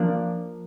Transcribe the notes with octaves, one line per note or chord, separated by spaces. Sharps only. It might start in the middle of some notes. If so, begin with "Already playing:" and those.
Already playing: F3 A#3 D4